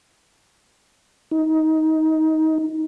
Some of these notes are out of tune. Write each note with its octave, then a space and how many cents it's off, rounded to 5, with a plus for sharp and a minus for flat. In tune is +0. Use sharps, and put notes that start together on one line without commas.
D#4 +20